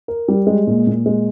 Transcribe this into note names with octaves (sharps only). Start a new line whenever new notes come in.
A#4
G3
G#3
A#2
A#2
G#3